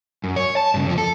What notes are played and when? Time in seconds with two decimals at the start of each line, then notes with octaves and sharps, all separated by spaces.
0.24 F#2
0.36 C#5
0.57 A5
0.74 G2 C#3
0.86 F2 F3
0.98 A4